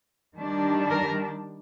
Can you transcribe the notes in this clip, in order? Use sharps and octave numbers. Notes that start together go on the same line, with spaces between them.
D#3 G3 D4
A#4